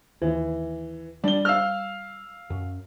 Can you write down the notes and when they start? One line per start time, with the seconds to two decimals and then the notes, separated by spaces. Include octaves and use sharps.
0.22 D#2 E3
1.24 G3 D4 G7
1.45 F5 E6 F6
2.50 F#2